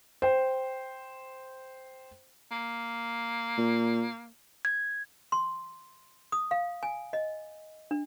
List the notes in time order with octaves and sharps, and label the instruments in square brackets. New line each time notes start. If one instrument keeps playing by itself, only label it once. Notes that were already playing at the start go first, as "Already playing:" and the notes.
[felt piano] C5 G5
[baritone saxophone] A#3
[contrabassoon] A#2
[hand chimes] G#6
[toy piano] C6
D#6
F5
G#5
D#5
D4